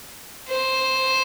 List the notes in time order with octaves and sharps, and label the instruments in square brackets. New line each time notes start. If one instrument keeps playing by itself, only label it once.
[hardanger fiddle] C5